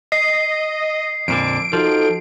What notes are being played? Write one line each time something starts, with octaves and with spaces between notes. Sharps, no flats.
D#5 C7
F2 A#2 D3 D7
F3 D#4 F#4 A4